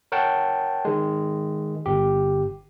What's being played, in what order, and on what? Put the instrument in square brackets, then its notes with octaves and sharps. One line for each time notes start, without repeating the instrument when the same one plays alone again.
[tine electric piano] A#4 C#5 F#5 G5 A5
D#3 G#3
G1 G4